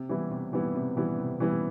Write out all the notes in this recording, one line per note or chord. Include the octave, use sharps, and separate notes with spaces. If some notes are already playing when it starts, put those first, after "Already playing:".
Already playing: C3
E3 G3 B3 E4
C3
E3 G3 B3 E4
C3
E3 G3 B3 E4
C3
E3 G3 B3 E4